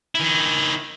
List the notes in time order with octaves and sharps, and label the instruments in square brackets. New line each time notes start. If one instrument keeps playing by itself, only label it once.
[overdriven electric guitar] D#3 E4